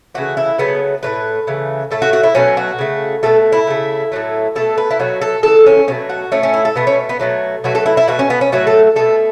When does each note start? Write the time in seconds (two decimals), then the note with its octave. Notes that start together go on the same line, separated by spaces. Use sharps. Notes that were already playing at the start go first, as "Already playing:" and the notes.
0.15 C#3 E3 A3 F#4
0.37 E4
0.58 C#3 F#3 A3 B3
1.03 A2 F#3 A3 B4
1.47 C#3 E3 A3
1.91 A2 A3 A4
2.02 F#4
2.13 F#4
2.23 E4
2.35 B2 F#3 A3 C#4
2.57 F#4
2.79 C#3 A3
3.23 B2 A3 A4
3.52 E4
3.67 C#3 A3
4.12 A2 F#3 A3
4.55 B2 A3 A4
4.78 B4
4.91 E4
4.99 B2 F#3 A3 F#4
5.22 A4
5.43 C#3 E3 A3 A4
5.66 C#4
5.88 B2 F#3 A3 C#4
6.09 F#4
6.32 A2 A3 C#4
6.43 C#4
6.54 E4
6.65 A4
6.76 B2 A3 B3
6.87 C#4
7.09 B3
7.19 B2 F#3 A3
7.64 B2 F#3 A3 F#4
7.75 A4
7.86 E4
7.97 E4
8.08 B2 A3 F#4
8.19 C#4
8.30 B3
8.41 C#4
8.52 A2 F#3 A3 F#4
8.67 A4
8.96 B2 A3 A4